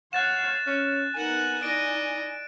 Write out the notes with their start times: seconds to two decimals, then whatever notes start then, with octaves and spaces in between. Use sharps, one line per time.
0.13 C#5 F5 F#5 F#6 A6 E7
0.67 C#4 F5
1.14 B3 D#4 A#4 F#5 G#5
1.63 D#4 E4 D5 D#5 D7